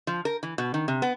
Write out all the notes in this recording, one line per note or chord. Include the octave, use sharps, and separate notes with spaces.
F3
A#4
E3
B2
D#3
C3
B3